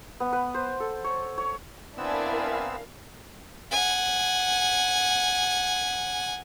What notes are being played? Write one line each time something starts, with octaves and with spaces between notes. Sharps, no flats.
B3
B4
C5
A4
C#5
C#5
B3 C4 D4 E4 A#4 F5 G#5 E6
F#5 G#5